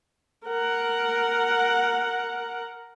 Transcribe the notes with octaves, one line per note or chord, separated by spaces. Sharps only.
A#4 F#5